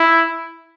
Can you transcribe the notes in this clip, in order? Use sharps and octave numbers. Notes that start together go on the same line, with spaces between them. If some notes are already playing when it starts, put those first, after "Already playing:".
Already playing: E4